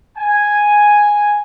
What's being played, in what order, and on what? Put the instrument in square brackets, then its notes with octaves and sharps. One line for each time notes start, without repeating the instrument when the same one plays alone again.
[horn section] G#5